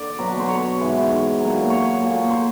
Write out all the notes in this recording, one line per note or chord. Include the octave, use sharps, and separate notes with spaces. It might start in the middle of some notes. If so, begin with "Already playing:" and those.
Already playing: D3 D5
B2 F#3
C5
C#5
G#2 E3
C#5
A#2 F#3
C#5
A#2 F3
C5